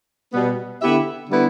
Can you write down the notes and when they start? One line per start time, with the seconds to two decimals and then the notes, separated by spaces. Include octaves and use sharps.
0.33 B2 G3 B3
0.81 D3 B3 E4 G4 E5
1.29 D3 G3 B3 E4